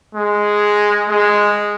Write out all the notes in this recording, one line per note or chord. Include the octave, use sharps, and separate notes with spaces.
G#3
G#3